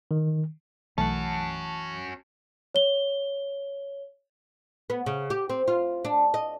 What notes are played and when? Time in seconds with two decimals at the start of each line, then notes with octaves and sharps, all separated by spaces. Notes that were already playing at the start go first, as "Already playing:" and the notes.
0.11 D#3
0.98 B1 E3 A3 C#4 F#4 A5
2.75 C#5 G7
4.90 B3
5.06 C#3
5.30 G4
5.50 C4
5.68 F4
6.05 D4
6.34 D#5